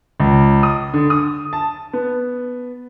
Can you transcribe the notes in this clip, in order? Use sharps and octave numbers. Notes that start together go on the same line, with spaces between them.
C#2
D#6
D3
D#6
A5
B3